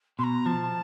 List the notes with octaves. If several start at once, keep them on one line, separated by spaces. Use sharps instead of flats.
B2 A#5 C6
F3 A5